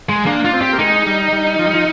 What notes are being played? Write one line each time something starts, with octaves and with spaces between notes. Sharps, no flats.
G#3
A#3 D4
F4
C4
G4
A#3
G#3 D#4
G3
G3
F3
G3
F3